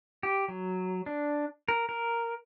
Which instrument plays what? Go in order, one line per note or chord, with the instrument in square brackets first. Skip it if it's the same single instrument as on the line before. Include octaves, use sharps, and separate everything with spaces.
[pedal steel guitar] G4
F#3
D4
A#4
A#4